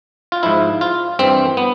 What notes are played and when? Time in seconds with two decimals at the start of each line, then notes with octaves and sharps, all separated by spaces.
0.32 F4
0.43 G#2 F3 E4
0.81 F4
1.19 G2 E3 C4
1.57 B3